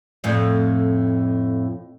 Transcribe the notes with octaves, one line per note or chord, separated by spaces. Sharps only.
F2 A2